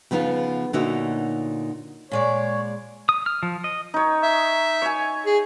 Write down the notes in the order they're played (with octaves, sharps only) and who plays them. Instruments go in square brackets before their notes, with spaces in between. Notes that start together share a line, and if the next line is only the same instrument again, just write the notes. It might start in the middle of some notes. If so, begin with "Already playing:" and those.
[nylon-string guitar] C#3 F3 B3 D#4 F4
A#2 D3 D#4 F#4 C#5 E5
[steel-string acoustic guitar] A#2 G#3 D5 [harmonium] C#5
[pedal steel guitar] D#6
F6
F3
D#5
[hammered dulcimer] D#4 C#5
[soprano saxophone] E5
[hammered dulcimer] C#5 G#5
[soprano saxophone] G#4